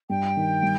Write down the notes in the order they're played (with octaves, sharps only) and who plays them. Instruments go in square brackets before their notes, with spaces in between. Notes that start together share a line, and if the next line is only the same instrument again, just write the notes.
[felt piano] G2 [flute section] G5
[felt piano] D#3
G3